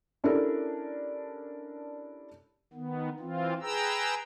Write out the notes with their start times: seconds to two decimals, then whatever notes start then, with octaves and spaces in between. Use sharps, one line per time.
0.24 C#4 D4 E4 G4 A4 A#4
2.73 D#3 B3
3.20 E3 C4 F4
3.62 G#4 B4 G5 A#5 E6